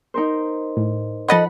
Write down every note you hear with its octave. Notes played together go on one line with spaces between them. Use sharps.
D#4 A#4 C5
A2
F3 A4 D#5 F#5 B5